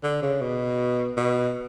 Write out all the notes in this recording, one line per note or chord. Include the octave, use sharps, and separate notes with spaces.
D3
C#3
B2
B2